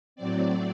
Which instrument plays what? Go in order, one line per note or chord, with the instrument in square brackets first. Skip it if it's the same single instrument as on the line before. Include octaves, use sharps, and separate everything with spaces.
[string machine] A2 F#3 C4 D5